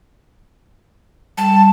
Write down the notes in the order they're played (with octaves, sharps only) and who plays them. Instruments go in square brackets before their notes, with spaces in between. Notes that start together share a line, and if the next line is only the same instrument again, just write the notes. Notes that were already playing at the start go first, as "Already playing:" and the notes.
[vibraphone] G3 [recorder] A5